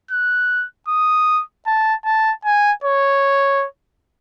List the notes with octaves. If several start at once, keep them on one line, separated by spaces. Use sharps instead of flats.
F#6
D#6
A5
A5
G#5
C#5